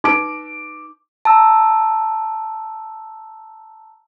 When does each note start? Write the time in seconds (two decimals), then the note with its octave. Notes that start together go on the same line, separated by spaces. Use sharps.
0.04 D#4 B4 D6 D7
1.25 A5 A#5 E6